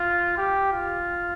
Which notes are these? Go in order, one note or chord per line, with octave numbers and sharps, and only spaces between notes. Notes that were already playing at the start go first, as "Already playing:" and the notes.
Already playing: F4
G4
F4